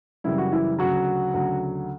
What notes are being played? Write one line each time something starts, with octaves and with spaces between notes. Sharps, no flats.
F#2 C#3 E3 G3 E4
F#4
E3 E4
D2 C#3 F#3 F#4
D2 C#3 F#3